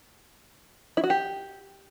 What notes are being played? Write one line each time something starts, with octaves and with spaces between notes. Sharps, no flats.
E4
F#4
G4